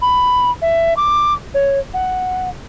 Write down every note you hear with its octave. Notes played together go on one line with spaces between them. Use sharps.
B5
E5
D6
C#5
F#5